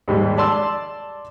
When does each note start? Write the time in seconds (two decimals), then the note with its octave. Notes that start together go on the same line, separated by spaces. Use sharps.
0.08 D#2 G#2 G3
0.38 D5 A5 C6 E6